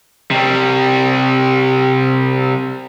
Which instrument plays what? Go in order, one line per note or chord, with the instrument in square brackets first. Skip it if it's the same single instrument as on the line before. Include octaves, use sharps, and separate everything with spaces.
[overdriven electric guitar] C3 G3